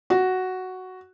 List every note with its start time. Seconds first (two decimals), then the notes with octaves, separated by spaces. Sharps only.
0.10 F#4